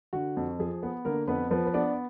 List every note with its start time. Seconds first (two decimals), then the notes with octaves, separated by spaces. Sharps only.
0.13 D3 F#4
0.37 F2
0.59 F3 G#4
0.83 B3
1.05 D3 A#3 A#4
1.28 F2 B3 B4
1.51 F3 B3 B4
1.66 B4
1.74 B3 D4 D5